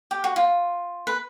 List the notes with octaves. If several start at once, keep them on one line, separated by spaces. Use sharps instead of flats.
G4
F#4
F4
B4